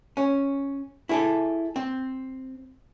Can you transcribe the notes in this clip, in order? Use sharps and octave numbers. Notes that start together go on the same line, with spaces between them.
C#4
E4 G#4 A4
C4